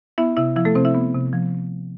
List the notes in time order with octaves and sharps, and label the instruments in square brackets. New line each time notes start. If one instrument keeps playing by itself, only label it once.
[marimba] B3 E4 E5
C3 E4 E5
F3 E4 E5
A3 A4
C3 C4 C5
E4 E5
B3
C3
F3